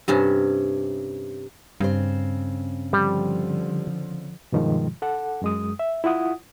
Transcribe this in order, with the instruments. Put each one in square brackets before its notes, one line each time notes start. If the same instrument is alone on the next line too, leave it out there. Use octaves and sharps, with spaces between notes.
[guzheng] G2 C3 C#4 A5
[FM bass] G2 [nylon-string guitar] C#3 C4 C5
[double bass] D3 F3 [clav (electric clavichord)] G3
[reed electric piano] G2 B2 D#3 F3 G#3
A4 F#5
F#2 G#3 D#6
E5
E4 F4 F#5 D#6